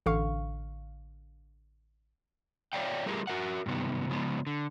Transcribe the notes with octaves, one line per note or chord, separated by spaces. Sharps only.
A1 D3 F5 C#6
C#5 D5 E5 F5 G5
G3 A3 F4 G4 G#4 A#4
F#4 A#4 E5 F#5
G2 C3 D#3 B3
C#3 F3 G#3 B3
D3